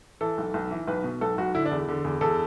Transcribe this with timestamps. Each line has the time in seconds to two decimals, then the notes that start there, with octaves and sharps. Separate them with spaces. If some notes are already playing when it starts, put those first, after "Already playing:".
0.21 E3 A4
0.38 B1
0.54 B1
0.71 E3
0.88 B1 B4
1.04 B2
1.21 B1 A4
1.38 B1 F#4
1.54 D3 E4
1.66 D4
1.71 E2
1.88 D3
2.04 E2
2.21 E2 A4